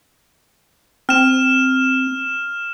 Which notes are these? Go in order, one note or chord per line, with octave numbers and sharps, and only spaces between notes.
C4 F6 E7